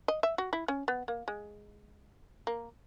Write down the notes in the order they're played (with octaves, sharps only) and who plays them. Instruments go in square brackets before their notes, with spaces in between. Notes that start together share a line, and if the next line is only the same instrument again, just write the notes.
[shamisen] D#5
E5
F#4
E4
C#4
B3
A#3
G#3
A#3